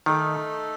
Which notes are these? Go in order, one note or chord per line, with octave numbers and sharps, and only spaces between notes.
D#3 A3 D#4 A4